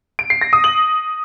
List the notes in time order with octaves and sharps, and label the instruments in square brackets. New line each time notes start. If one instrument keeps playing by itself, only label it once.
[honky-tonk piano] D7
C7
A#6
D#6
F#7